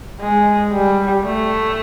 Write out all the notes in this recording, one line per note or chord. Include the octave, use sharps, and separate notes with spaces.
G#3
G3
A3